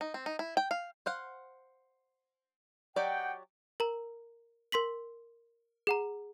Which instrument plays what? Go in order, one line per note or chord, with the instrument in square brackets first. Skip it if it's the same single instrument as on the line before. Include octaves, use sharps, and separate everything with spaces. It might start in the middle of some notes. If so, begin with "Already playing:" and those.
[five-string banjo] D#4
C4
D#4
E4
G5
F5
C5 F5 F#5
[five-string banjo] F#3 G4 D5 [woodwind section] D#5 F#5 G5
[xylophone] A#4 A#5
A#4 C6 B6 F#7
G#4 F#5 A#5